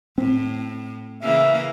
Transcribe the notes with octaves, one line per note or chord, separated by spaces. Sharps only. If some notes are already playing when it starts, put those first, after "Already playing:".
A2 C4
C#3 E3 A#3 E5